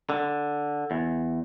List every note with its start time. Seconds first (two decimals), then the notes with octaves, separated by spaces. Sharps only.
0.10 D3
0.91 E2